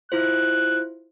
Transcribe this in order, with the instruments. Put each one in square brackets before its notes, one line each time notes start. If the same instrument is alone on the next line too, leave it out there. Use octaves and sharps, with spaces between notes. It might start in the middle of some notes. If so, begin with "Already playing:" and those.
[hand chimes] E4 F4 C5 [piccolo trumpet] F#6